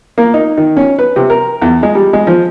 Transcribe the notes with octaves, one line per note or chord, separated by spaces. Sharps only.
A#3
D#4
D#3
C#4
B4
C3
A#4
E2
G#3
G3
G#3
F3